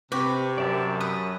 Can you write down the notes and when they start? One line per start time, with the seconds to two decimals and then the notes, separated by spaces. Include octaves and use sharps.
0.12 C3 F#4 G4 B4
0.58 F#2 D5 E5 A5
1.00 B4 D#6